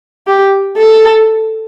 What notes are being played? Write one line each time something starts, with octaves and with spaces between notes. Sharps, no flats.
G4
A4